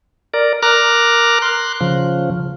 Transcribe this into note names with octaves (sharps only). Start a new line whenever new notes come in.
A#4 D5
A#4 A#5 D6 F6 F#6
C6 F#6
C#3 F3